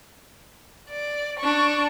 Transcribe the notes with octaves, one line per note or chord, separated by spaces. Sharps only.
D5
D4 C#6